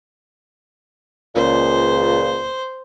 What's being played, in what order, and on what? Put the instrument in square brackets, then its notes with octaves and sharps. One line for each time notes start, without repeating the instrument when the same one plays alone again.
[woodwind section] C#2 A#2 [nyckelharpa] C5